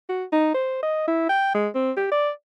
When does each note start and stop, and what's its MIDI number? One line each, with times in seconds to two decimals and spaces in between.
0.09 0.24 66
0.32 0.52 63
0.54 0.82 72
0.83 1.04 75
1.08 1.27 64
1.29 1.52 79
1.54 1.68 56
1.75 1.91 60
1.97 2.11 67
2.12 2.30 74